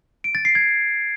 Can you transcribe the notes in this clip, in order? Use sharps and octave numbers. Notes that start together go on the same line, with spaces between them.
D7
A6
C7
G#6